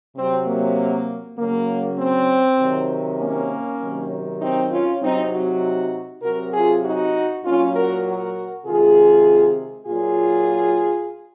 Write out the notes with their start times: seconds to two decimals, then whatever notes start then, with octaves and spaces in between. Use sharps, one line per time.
0.16 C3 F#3 C4
0.47 A#3
1.38 C#3 F#3 A#3
1.98 C4
2.60 C3 D#3 F#3
3.19 A#3 C#4
3.80 C3 D#3 F#3
4.41 C4 D#4
4.71 C#4 F4
5.02 C3 F#3 C4 D#4
5.32 D#4 F#4
6.23 C3 F#3 F#4 A#4
6.53 F4 G#4
6.83 D#4 F#4
7.44 A#2 F#3 C#4 F4
7.74 F#4 A#4
8.05 F#4 A#4
8.66 C3 D#3 G#3 F4 G#4
9.86 A#2 F#3 F4 G#4